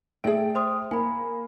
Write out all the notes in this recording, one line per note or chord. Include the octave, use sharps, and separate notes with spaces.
A3 G#4 D5 G5 D7
C5 C6 D#6
A#3 G#5 B5